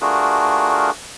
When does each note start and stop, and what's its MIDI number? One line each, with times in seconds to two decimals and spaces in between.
0.01 0.90 57
0.01 0.90 62
0.01 0.90 65
0.01 0.90 66
0.01 0.90 68
0.01 0.90 70